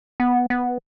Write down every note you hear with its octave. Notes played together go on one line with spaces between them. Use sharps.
B3
B3